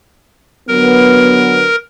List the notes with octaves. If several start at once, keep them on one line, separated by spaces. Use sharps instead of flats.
D3 F#3 B3 A#4